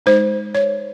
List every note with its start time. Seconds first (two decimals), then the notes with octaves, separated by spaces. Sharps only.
0.06 G#3 D#4 C5
0.55 C#5